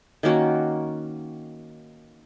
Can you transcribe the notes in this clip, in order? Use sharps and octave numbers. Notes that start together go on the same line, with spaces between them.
D#3 A#3 C#4 F#4